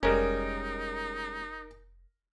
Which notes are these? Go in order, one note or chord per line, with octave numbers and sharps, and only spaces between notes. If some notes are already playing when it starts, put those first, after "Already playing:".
F1 G3 G#3 C#4 D#4 A#4